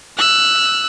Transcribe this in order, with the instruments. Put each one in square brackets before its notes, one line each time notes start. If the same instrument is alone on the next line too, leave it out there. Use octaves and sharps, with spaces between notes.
[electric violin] E6 F#6